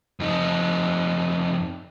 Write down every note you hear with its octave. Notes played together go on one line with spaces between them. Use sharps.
F2 D#4